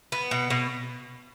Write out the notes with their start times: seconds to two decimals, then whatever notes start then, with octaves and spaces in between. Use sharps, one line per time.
0.12 B3
0.31 B2
0.50 B2